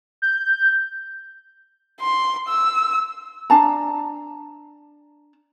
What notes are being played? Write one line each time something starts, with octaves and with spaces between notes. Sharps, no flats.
G6
C6
E6
D4 A5 A#5